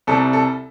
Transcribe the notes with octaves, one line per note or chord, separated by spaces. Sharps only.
C2 C3 G3 A4
A4